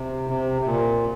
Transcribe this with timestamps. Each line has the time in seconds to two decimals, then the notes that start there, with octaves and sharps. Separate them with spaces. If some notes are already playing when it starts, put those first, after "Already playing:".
Already playing: C3
0.30 C3
0.61 C3
0.66 A#2